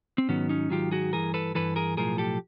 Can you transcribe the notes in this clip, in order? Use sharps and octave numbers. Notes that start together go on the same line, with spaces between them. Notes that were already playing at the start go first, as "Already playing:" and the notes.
C4
G#2 D#3 F#3 B3 C#4
C#4 D#4
G#2 D#3 F#3 F4 G4
F#4 G#4
G2 E3 G#4 A#4
A4 B4
G2 E3 A4 B4
G#4 A#4
B1 A2 F3 G#4 A#4
G4 A4